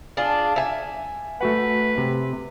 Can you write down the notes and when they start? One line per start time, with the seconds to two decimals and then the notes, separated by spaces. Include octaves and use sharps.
0.17 D4 F4 G#4
0.56 E5 G#5
1.41 A3 F#4 B4 F#5
1.98 C3